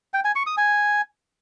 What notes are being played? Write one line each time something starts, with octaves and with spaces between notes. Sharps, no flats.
G5
G#5
C#6
D#6
G#5